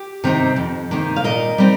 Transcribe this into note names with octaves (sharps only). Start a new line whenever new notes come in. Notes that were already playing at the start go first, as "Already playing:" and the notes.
Already playing: G4
C3 D#3 C4 D#4
F2
C3 D#3 A#3 D#4
F5
A#2 A#4 D#5
G3 C4 D#4